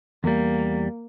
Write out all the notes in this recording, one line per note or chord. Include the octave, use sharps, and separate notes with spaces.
E2 G3 A#3